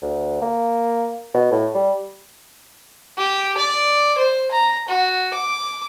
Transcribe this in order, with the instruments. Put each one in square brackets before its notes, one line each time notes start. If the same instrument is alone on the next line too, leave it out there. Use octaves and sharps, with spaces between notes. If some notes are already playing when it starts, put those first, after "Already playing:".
[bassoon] D2
A#3
B2
A2
G3
[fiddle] G4
D5
C5
A#5
F#4
D6